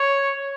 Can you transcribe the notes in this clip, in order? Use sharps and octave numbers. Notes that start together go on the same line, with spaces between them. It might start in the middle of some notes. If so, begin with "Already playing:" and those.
Already playing: C#5